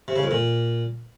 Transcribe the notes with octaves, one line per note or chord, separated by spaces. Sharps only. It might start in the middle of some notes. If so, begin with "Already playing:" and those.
C3
C#3
F2
A#2